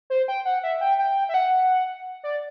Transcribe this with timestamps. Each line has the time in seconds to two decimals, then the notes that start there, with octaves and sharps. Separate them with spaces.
0.10 C5
0.28 G5
0.45 F#5
0.63 E5
0.81 G5
0.99 G5
1.29 E5
1.34 F#5
2.23 D5